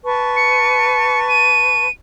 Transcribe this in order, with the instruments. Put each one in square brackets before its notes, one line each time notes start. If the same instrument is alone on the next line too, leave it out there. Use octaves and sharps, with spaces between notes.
[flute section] B4 A5 C#6
[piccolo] C#7
D#7